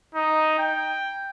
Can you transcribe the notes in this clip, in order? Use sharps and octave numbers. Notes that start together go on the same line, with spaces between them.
D#4
G5